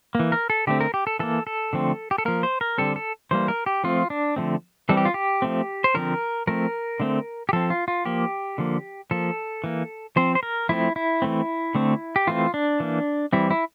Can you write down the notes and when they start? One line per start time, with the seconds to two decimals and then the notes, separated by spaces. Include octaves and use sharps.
0.15 E3 A#3
0.32 A#4
0.50 A4
0.67 D3 A3 C4 G4
0.81 A#4
0.94 G4
1.07 A4
1.19 E3 A#3 A4
1.47 A4
1.73 D3 F3 A3 C4
2.11 G4
2.18 A4
2.25 F3 A#3 A#4
2.43 C5
2.61 A#4
2.78 D3 G3 C4 A4
2.96 A4
3.31 E3 G3 A#3 C5
3.48 A#4
3.66 G4
3.84 F3 A3 C4 F4
4.10 D4
4.36 D3 F3 A3 C4
4.89 E3 G3 C4 A4
4.97 G4
5.05 F4
5.14 G4
5.42 F3 A3 C4
5.84 C5
5.94 D3 F3 C4 A#4
6.47 F3 A3 C4 A#4
7.00 D3 A3 C4
7.49 G4
7.53 F3 C4 A4
7.70 F4
7.88 F4
8.05 F3 A#3 G4
8.58 D3 F3 A#3
9.11 F3 A#3 A4
9.64 E3 A#3
10.16 F3 C4 C5
10.35 C5
10.43 A#4
10.69 F3 A3 C4 E4
10.96 E4
11.22 E3 A3 C4
11.75 D3 A3 C4
12.16 G4
12.27 E3 A3 C4 F4
12.54 D4
12.80 E3 A#3
13.33 E3 G3 C4 E4
13.51 E4